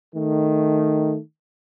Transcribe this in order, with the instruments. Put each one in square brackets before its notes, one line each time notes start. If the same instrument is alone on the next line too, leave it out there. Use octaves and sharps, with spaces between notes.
[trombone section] D#3 A3